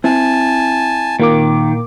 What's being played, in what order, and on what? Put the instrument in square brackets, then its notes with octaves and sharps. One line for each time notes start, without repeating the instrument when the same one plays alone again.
[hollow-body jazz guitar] C4 E4 [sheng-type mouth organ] G#5 A5
[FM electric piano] A#2 A#3 D6 [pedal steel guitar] D#3